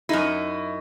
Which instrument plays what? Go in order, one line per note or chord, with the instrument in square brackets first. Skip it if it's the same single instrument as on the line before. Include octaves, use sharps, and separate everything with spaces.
[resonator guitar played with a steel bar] F#2 D#4 [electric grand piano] E4